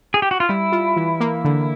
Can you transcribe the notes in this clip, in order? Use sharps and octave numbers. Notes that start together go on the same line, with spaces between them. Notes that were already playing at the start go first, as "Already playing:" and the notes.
G#4
G4
F#4
F4
G3 E4
F4
E3
A#3
D3